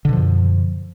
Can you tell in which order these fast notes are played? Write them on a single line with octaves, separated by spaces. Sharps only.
D3 B2 F3 F#2